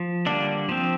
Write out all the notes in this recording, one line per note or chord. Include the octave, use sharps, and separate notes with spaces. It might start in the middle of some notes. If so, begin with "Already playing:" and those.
Already playing: F3
D3 G3 A#3 D4
F3 C4